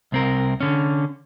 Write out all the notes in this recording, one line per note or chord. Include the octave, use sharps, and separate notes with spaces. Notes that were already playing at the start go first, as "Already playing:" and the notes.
C2 C4 A#4
D3 C#4